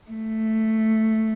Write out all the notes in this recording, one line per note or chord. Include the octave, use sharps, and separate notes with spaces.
A3